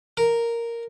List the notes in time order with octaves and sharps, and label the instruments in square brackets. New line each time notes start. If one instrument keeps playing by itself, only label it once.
[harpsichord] A#4